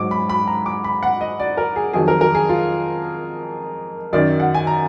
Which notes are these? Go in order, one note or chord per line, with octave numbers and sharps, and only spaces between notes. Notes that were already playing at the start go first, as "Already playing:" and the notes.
Already playing: G#2 F#3 D6
B5
B5
A#5
D6
B5
F#5
D#5
D5
A#4
G#4
F2 D#3 F#3 G#4
A#4
A#4
G#4
F4
F#2 D#3 F#3 D5
F#5
G#5
A#5